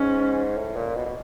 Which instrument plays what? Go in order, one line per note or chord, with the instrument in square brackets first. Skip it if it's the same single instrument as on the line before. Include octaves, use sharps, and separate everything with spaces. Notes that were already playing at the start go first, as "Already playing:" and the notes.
Already playing: [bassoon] G#2 [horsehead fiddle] C#4
[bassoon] A2
A#2
B2
B2